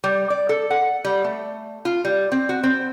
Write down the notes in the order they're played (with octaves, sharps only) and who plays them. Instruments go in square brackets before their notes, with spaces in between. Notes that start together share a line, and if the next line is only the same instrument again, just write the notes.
[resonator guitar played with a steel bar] G3
D5
A4
F#5
G3
A3
F4
G3
C4
F#4
C4